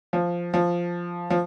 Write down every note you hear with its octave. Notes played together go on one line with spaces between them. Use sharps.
F3
F3
F3